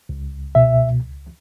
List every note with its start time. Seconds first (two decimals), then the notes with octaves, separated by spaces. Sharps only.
0.09 C#2
0.55 B2 E5